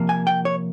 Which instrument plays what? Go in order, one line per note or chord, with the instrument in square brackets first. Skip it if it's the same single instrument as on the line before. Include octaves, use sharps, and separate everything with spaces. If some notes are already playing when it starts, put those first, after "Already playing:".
Already playing: [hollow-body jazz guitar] C3 F3 A#3
G#5
G5
C#5